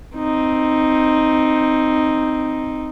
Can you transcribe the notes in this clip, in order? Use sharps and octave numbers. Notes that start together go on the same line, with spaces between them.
C4 D#4